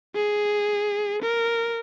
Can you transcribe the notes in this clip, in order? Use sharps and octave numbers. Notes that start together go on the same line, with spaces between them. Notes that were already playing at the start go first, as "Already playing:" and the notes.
G#4
A#4